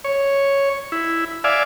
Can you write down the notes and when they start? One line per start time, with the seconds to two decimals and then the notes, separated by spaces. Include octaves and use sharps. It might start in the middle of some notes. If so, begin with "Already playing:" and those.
0.04 C#5
0.92 E4
1.44 D5 E5 F5 G#5